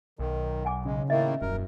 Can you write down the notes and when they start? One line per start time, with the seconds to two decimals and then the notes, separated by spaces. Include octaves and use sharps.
0.19 B1 D#3
0.65 F#5 G#5 D6
0.85 C#3 G#3
1.10 A2 D#3 A#3 E4 D#5 E5
1.42 D#1 F#2 A#4